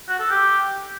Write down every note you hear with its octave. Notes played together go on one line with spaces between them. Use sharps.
F#4
A4
G4